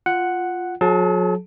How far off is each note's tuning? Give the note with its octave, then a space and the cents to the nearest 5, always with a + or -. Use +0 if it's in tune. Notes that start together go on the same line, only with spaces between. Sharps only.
F4 +0 F#5 +0
F#3 -35 G#4 +45 A5 +0